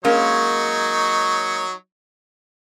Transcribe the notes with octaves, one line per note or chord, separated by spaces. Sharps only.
F#3 G#3 A#3 C#4 D#4 C#5